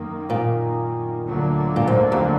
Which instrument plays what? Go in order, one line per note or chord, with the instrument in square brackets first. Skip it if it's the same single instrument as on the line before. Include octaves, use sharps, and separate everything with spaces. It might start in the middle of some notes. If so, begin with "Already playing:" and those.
Already playing: [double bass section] F#2 D#3 A#3
[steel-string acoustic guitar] A#2
[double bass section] D2 D3 F#3 A#3
[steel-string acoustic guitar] A#2
G#2
F2